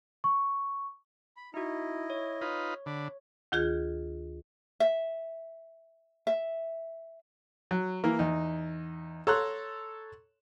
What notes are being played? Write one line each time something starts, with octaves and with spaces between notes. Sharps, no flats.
C#6
B5
D#4 E4 F#4 D#5
C#5
D#4 F4 B4
D3 B5 D6
D2 D#3 F4 G#4 G6
E5
E5
F#3
E3 A#3
E2 D#4
A4 C#5 A#5 C6 C#6 F#6